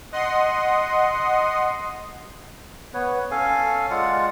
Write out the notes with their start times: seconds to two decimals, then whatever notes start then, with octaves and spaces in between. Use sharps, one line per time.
0.12 D#5 F#5 C6 D#6
2.94 B3 B4 C#5
3.31 C#4 A4 F5 G#5
3.91 G#3 F4 D5 F#5